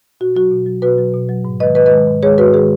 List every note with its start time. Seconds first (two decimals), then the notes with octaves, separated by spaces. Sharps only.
0.20 B2 F#4
0.35 F#3 F#4
0.51 B2
0.66 F#3
0.82 B2 F#4 B4
0.98 F#3
1.14 B2
1.29 F#3
1.45 G#2
1.60 G#3 B4 D#5
1.63 D#3
1.75 G#2 B4 D#5
1.86 B4 D#5
1.91 D#3 G#3
2.07 G#2
2.23 D#3 G#3 G#4 C#5
2.38 G#2 F#4 B4
2.54 D#3 G#3 G#4